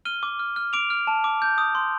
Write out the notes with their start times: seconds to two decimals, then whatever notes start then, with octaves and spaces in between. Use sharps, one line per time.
0.05 F6 D#7 G7
0.23 D6
0.39 F6
0.56 F6
0.73 D6 D7 F7
0.90 F6
1.07 A5
1.24 D6
1.42 G6
1.58 D#6
1.75 C6